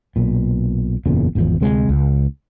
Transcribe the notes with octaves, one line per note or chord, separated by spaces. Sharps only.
B1 A#2
F#1 E2 A#2 C#3
G#1 E2 C#3 F3
D2 C3 G#3
C#2